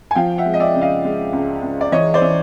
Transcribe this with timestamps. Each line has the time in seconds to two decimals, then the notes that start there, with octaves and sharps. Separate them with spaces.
0.11 G#5
0.15 F3 F5 G5
0.38 E5 F#5
0.46 G#3
0.54 D#5
0.60 D5 E5
0.75 C#3
0.81 D#5 F5
1.05 G#3
1.33 C#2
1.62 C#2
1.81 D5
1.92 E3 C#5 D#5
2.14 C5 D5
2.22 E3